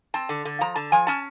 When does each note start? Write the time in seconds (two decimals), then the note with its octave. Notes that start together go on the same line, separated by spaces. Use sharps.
0.14 C4 A5
0.29 D3
0.45 D3
0.61 F3 A#5
0.76 D3 A5
0.92 F3 G#5
1.07 C#4 A5